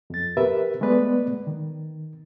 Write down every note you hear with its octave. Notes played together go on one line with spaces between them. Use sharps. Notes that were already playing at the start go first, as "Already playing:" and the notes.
F2 A6
G4 A#4 B4 E5
G#3 A3 B3 B4 D5
D#3